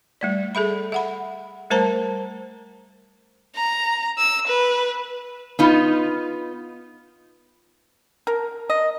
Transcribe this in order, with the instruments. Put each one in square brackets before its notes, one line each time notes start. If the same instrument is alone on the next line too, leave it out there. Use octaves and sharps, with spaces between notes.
[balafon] G3 A3 D5
G#4 A4 E5 B5
E5 F#5 B5
G3 A3 A#4 C5 A5 A#5
[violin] A#5
E6
B4
[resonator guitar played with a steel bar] B3 D#4 F4
[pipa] A#4
D#5